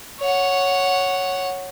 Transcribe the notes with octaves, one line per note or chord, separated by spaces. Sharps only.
C#5 F#5